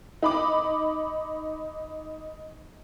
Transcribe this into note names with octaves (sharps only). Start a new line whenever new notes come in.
D#4 B5 D6